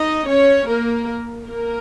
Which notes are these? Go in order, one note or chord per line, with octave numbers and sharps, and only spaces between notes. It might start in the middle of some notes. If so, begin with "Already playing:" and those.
Already playing: D#4 D#5
C#4 C#5
A#3 A#4
A#3 A#4